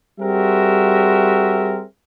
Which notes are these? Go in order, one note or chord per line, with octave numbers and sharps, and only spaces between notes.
G3 C4 F#4 G#4 A#4 E5